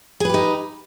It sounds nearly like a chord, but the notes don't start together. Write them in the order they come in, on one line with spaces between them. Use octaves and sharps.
G#4 B4 G4 D#4